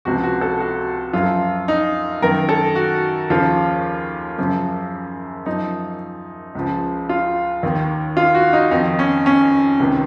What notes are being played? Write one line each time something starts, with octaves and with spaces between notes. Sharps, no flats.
C#2 C3 F3 F#4
F#4
A4
F#4
F#2 F3 F4
D#4
F#2 D#3 A#4
A4
F#4
D#2 C#3 F3 F4
F#2 C#3 F3
F#2 F3 D#4
C#2 C#3 F3
F4
D#2 D#3
F4
F#4
D#4
F2 D#3 D#4
C#4
C#4
C#2 C3 D#3